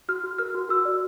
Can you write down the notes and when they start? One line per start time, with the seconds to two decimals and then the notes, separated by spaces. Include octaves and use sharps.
0.09 F#4 F6
0.24 F#4
0.38 A#4 F6
0.55 F#4
0.69 F#4 E6
0.85 D5